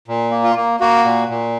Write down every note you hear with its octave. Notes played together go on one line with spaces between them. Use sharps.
A#2
A#3
F4
A#3
A#3 F#4
A#2
A#2